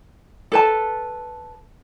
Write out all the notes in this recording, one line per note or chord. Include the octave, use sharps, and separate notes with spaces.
A4 B4 A5